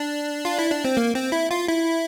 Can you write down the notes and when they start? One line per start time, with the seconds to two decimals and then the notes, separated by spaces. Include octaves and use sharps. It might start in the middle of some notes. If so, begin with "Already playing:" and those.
Already playing: D4
0.45 F4
0.58 E4
0.71 D4
0.85 C4
0.97 A#3
1.15 C4
1.32 E4
1.51 F4
1.68 E4